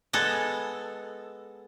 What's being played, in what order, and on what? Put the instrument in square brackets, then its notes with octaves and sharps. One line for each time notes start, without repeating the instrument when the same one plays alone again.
[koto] G#3 B3 A4